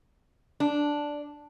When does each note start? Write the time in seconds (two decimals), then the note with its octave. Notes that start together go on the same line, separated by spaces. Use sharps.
0.60 D4